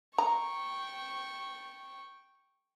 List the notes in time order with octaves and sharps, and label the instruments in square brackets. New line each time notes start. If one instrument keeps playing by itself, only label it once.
[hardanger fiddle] G5 C#6 [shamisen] A#5